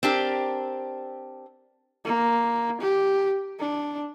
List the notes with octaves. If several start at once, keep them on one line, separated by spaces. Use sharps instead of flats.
C4 D4 G4 A#4
A#3
G4
D4